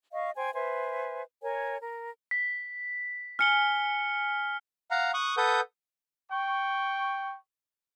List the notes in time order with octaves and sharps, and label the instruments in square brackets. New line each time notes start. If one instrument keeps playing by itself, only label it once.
[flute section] D#5 F5 C#6
C5 G5 G#5
B4 C5 E5 G#5
A#4 C#5 G#5
A#4
[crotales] B6
[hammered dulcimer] G#5 [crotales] F6 C#7 G7
[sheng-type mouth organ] F5 F#5 A#5
C#6 D#6 F#6
A4 B4 F#5 D#6 G6
[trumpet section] G5 C#6